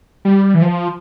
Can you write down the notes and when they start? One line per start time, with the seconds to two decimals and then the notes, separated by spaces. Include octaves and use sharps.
0.25 G3
0.54 E3
0.62 F3